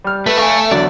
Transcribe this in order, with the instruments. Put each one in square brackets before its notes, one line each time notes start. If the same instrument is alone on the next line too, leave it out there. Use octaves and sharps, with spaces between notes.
[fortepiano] G3 F6
[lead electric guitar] A3 [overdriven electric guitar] B4
[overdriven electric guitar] F5 G#5 [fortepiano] C#6
[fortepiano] E2 D3 F#3 [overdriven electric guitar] D5